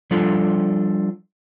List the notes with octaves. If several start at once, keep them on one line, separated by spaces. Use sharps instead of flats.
F3 G3 D4 F4 A4